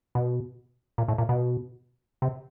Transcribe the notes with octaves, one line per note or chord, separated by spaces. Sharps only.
B2
A#2
A2
A#2
B2
C3